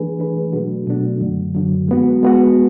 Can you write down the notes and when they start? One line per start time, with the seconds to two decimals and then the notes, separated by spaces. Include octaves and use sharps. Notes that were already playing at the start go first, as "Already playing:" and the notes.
Already playing: E3 A3 D4 G#4 B4
0.19 E3 A3 D4 G#4 B4
0.53 B2 F#3 A3 D4 F#4
0.87 B2 F#3 A3 D4 F#4
1.21 F#2 D3 F#3
1.55 F#2 D3 F#3
1.88 G#3 B3 F#4
2.23 G#3 B3 F#4